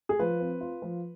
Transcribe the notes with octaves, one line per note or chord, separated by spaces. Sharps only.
G#4
F3 B4
C4
F4
F3